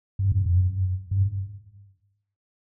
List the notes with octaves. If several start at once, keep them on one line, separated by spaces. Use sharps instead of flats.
G2
F#2
F2
F#2
G2